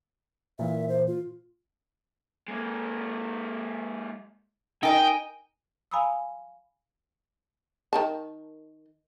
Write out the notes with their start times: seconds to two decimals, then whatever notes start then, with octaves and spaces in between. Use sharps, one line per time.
0.59 A#2 E3 E5
0.89 C5
1.07 F4
2.48 G#3 A#3
4.83 D#4 A#4 D#5 G5 G#5
5.91 F5 G#5 A#5 B5 D#6 E6
7.93 D#3 A#4 A5